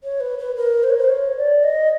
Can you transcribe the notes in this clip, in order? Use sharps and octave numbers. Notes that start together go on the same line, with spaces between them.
C#5
B4
B4
A#4
C5
C#5
C5
C#5
D5
D#5